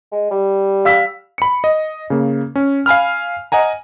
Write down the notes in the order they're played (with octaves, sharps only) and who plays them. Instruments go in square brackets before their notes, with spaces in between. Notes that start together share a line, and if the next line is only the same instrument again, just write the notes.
[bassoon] G#3
G3
[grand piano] F5 E6 B6
[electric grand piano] B5 C#7
D#5
C#3 A#3
C#4
F5 G#5 B5 F6
D#5 F#5 G#5 A#5